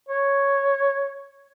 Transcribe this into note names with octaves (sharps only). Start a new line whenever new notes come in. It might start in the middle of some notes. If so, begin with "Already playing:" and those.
C#5